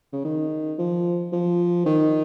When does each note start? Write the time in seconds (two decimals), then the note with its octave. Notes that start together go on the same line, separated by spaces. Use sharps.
0.13 C#3
0.25 D#3
0.79 F3
1.33 F3
1.86 D#3